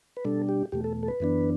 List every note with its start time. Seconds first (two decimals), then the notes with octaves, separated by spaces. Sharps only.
0.17 B4
0.25 B2 G3 D4 A4
0.49 G4
0.72 E2 B2 A3 G4
0.84 A4
1.03 A4
1.08 B4
1.20 F#2 E3 B3 D4